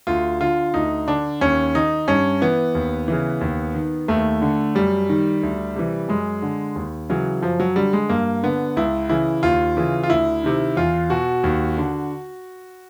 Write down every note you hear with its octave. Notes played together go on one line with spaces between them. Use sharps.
D2 F4
D3 F4
D2 D#4
D3 D4
D#2 C#4
D#3 D#4
G2 C#4
E3 B3
D#2
C#3 E3
D#2
D#3
D#2 A3
D3
F#2 G3
D#3
D2
C3 E3
F#2 G#3
D3
D#2
C#3 E3 F#3
F#2 F3
F#3
D3 G3
G#3
G2 A#3
D3 B3
C#2 E4
C#3 E3 E4
D#2 F4
C#3 E3
F4
D2 E4
C3 D#3
E2 F4
B2 F#4
D#2
D3